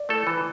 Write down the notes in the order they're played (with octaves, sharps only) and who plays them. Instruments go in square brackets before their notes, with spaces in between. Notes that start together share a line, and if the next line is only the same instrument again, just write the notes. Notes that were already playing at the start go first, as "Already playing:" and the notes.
Already playing: [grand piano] D5
[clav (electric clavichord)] A3 E4 A4
E3